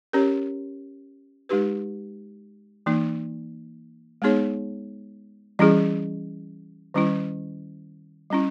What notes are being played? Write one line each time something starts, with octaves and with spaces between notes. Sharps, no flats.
C#4 G4 A#4 C#5
G#3 D#4 G4 B4
E3 A#3 D#4
G#3 B3 D#4 G#4 C#5
E3 G3 C#4 E4 G#4
D#3 G3 C#4 E4
G3 C#4 E4